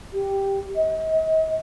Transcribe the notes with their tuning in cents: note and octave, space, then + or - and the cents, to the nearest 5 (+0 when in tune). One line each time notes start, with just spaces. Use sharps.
G4 +0
D#5 +40